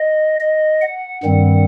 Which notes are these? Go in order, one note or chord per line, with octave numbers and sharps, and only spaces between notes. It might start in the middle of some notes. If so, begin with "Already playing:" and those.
Already playing: D#5
D#5
F#5
G2 D#3 G3 C4